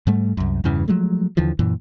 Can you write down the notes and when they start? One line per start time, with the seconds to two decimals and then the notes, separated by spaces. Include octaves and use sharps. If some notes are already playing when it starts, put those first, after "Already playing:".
0.07 G#2 G3 A3
0.37 C2 F#2
0.64 E2 G2 C#3 E3
0.88 F3 F#3 G#3 A3
1.37 D#2 D3 E3 F3
1.59 F#2 A#2 E3